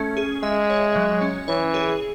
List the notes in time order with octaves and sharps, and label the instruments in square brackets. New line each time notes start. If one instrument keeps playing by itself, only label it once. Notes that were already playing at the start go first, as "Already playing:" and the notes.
Already playing: [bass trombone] A3 [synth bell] C#4
[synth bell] G#4
[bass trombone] G#3 [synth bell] E5
[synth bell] C#5
F#3
C#4
[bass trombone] E3 [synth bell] C#5
[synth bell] G#4